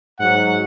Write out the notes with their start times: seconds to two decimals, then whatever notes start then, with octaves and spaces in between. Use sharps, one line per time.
0.18 G#2 F#3 F#5